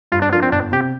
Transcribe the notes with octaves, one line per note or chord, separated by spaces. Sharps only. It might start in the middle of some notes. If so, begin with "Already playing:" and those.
G2 F4
D4
F3 D4 F4 A#4
C4
G1 D4
C3 G4